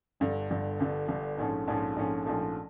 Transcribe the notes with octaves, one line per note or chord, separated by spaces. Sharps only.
G1 G2 D3
G1 G2 D3
G1 G2 D3
G1 G2 D3
A#1 G#2 F3 A3 C#4
A#1 G#2 F3 A3 C#4
A#1 G#2 F3 A3 C#4
A#1 G#2 F3 A3 C#4